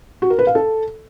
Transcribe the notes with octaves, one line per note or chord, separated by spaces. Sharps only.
F#4
A#4
B4
F5
A4